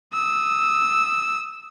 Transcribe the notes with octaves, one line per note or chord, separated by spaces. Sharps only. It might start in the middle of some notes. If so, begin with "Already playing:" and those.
D#6 E6